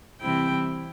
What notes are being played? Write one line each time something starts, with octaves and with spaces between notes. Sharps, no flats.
C3 E3 G3 C4 E4 G5